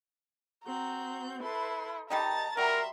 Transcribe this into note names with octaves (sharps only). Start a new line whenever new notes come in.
C4 F#4 A#5 G6
E4 A4 B4 C6
D#3 G3 D#4 A5 A#5 A6
F#3 G3 A#4 E5 A#5 C6